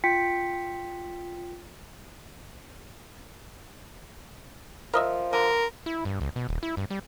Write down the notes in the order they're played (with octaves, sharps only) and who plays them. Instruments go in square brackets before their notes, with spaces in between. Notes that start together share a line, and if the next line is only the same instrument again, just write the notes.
[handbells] F4 G5 B6 C#7
[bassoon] F3 [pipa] A#4 D#5 E5
[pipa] D3 [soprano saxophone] A#4
[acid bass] E4
G2
C#2
B2
D#1
E4
G2
G3